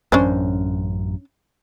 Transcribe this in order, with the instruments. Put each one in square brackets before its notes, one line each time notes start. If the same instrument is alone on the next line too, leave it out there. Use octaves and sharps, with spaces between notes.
[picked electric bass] A1 F#2 [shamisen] C#4 D4 C5